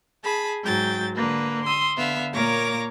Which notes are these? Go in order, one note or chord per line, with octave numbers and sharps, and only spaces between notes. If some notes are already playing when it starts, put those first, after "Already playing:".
G#4 A5 B5
G#2 F#3 G5 A6
D3 A#3 B4
C6 D#6 E6
D3 B3 E5 F5
A#2 A#3 A#4 C#5 D6 A#6